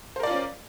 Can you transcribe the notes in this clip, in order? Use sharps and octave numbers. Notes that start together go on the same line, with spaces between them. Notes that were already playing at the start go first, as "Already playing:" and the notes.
C#4 F4 A#4 C5 D5